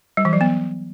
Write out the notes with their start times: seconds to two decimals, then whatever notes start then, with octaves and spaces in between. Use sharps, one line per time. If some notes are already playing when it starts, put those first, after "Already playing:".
0.17 G3
0.25 E3
0.33 F#3
0.41 B3